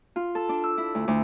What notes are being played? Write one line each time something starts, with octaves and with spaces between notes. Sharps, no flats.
F4
A4
D4
E6
E4
D2
D2